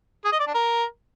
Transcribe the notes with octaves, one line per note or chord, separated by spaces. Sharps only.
G#4
D#5
D5
D4
A#4